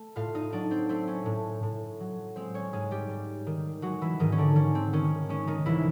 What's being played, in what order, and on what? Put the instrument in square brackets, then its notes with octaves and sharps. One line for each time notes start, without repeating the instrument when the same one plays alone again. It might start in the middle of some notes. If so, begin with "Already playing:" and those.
Already playing: [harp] A3
A2 F4 F5
D#4 D#5
F#3 D4 D5
C4 C5
A3 C4 C5
C#4 C#5
A2
A2
F#3
G#3 C4 C5
C#4 C#5
G#2 G#3 G#4
G3 G4
G#2
D#3
F#3 G#3 F#4
E3 E4
G#2 D#3 D#4
C#4
D3 D4
G#2 C#4
C4
D#3 C#4
G#3 C#4
D#3 D#4
C2 E3 E4